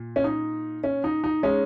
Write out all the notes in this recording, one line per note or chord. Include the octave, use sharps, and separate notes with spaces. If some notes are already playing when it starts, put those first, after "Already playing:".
Already playing: A#2
C#4
D#4
C#4
D#4
D#4
G#3 C#4 D#4